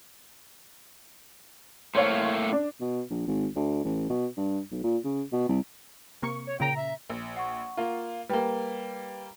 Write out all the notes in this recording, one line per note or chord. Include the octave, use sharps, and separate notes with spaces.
A2 A3 A#3 C5 C#5 F5
D4
B2
A#1
G#1
D2
A1
B2
G2
B1
A#2
C#3
B2
C2
C3 A#3 C#6
C#5
A#2 C#3 G5 A#5
E5
A#1
F#5 C#6
A#3 F4
G3 A#3 B4 G5